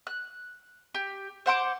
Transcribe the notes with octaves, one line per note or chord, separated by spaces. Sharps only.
F#6
G4
C5 F#5 C6 D6